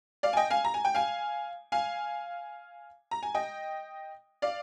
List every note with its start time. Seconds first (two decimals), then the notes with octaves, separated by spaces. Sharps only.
0.23 D5 F5
0.33 G#5
0.37 D#5 G5
0.50 F5 G#5
0.65 A#5
0.74 G#5
0.85 G5
0.95 F5 G#5
1.72 F5 G#5
3.11 A#5
3.23 G#5
3.35 D#5 G5
4.42 D5 F5